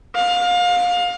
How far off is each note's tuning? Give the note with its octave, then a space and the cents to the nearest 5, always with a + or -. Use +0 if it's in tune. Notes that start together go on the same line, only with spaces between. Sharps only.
F5 +25